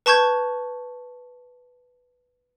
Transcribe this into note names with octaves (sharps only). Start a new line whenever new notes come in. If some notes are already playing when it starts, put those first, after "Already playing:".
B4 A5 C#6 G6 G#6